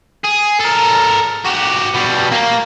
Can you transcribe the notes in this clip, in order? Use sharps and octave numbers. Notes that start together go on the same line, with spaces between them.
G#4
A4 A#4
F#4 G4
B2 G3
A#3